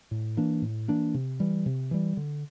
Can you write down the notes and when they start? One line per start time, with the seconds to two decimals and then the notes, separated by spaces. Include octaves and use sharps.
0.11 A2
0.37 E3 A#3 D4
0.62 A2
0.88 E3 A#3 D4
1.14 C3
1.40 E3 G3
1.66 C3
1.91 E3 G3
2.17 D3